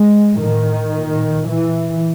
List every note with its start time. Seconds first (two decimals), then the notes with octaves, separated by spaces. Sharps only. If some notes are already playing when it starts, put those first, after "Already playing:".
Already playing: G#3
0.40 A2 D#3
0.94 A#2
1.47 A#2 E3